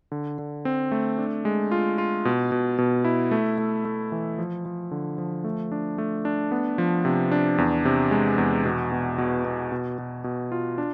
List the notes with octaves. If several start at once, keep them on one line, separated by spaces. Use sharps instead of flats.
D3
D3
C4
A3
D4
G#3
F4
F4
B2
B2
B2
E4
A3
A3
A3
E3
F3
F3
D3
F3
A3
D4
A3
D4
B3
F3
C3
D4
E2
C3
G#3
E2
B2
B2
B2
B2
B2
B2
B2
F4
D4